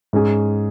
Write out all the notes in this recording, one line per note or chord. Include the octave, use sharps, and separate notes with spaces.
G#2 G#3 C#4 G#4